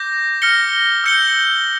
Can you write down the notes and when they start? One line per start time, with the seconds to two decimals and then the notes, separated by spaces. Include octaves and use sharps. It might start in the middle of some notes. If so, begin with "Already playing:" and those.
Already playing: D6 G6 A#6
0.42 F6 A#6 C#7 G7
1.04 E6 G6 C#7 G7